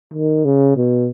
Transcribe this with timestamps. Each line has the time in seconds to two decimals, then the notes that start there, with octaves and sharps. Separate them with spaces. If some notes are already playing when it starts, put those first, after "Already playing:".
0.14 D#3
0.45 C#3
0.76 B2